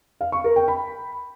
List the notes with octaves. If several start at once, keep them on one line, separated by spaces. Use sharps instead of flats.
F5
C#6
A#4
G5
B5